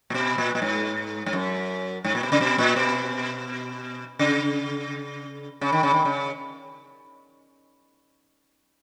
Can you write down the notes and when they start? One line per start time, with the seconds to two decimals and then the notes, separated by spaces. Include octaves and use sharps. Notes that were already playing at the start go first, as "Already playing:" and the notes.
0.10 A#2
0.14 B2
0.38 A#2
0.55 A#2
0.62 G#2
1.26 G#2
1.33 F#2
2.04 G#2
2.15 A#2
2.23 B2
2.32 C#3
2.41 B2
2.58 A#2
2.76 B2
4.19 C#3
5.61 C#3
5.72 D#3
5.83 C#3
5.94 D#3
6.05 C#3